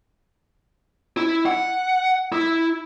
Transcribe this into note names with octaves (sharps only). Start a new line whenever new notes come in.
E4
F#5
E4